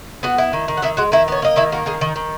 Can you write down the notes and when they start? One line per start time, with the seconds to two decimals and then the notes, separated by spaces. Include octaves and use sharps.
0.23 B3 F#4 F#5
0.38 E4
0.53 D#3
0.68 D#3
0.77 F#5
0.82 D#3 E4 E5
0.97 G#3 F#4 F#5
1.12 D#3 E4 E5
1.28 B3 C#5
1.42 A#3 D#5
1.56 D#3 E4 E5
1.72 A#3 F#4
1.86 D#3 G#4
2.01 D#3
2.16 D#3